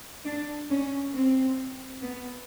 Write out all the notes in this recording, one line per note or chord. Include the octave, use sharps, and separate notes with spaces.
D4
C#4
C4
B3